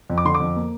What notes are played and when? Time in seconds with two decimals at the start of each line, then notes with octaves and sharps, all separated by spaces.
0.10 F2
0.18 D6
0.25 D3 C6
0.35 D6
0.40 F2
0.56 A#3